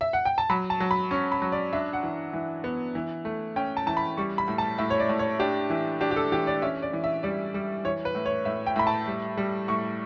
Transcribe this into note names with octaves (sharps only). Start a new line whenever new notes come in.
E5
F#5
G5
A5
F#3 B5
A5
F#3
B5
C#4 C#6
B5
F#3
D5
D4 E5
F#5
E3
E3
B3
E3
A3
C#4 G5
A5
E3 A5
B5
G3 C#6
B5
A2
A5
A2 E5
C#5
D5
A2
C#5
D4 G4
E3
D4 G4
G4
A4
E3 G4
D5
C#4 E5
D5
E3
E5
G3 D5
G3
E3 C#5
B4
A2
C#5
A2 E5
G5
A2 B5
A5
G3
G3
A2 C#6